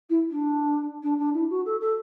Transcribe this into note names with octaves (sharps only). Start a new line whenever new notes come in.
E4
D4
D4
D4
E4
F#4
A4
A4